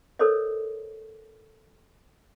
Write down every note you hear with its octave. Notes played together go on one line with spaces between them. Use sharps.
A4 A#4 C5 C#5 D#5